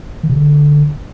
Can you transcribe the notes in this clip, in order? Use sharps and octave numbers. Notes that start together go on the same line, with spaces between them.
D#3
C3
D3